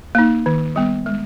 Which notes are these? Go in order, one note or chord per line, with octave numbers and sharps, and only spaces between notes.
A#3 D#4
D#3
G3 B3
G#3